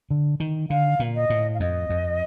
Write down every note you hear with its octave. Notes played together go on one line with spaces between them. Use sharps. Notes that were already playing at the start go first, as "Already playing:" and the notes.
D3
D#3
D3 F5
A#2
D#5
A2
F5
F2 D#5
F2